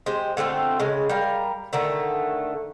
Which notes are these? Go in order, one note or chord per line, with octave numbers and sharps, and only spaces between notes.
G#3 G4 C5
D3 A3 C4 F4
C#3 G#3
G3 A#4 F5
D3 D#3 A3